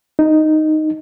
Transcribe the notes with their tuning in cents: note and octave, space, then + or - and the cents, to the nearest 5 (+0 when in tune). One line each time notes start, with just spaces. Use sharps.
D#4 -5